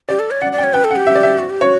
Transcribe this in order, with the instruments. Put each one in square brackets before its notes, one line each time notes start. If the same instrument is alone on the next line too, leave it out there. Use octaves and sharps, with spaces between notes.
[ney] G4 [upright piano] D5
[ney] A4
C#5
[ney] D5 [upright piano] F#5
[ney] D5
[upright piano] G5
[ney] C#5
[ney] B4 [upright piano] G5
[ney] A4
[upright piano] F#5
[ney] G4
[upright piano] E5
D5
E5
[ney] F#4
G4
[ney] F#4 [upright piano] C#5